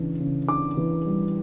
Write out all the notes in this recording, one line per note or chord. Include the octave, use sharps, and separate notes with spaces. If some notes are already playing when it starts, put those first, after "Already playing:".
Already playing: C#3 E3 D4
C#3
D4 D6
E3
G3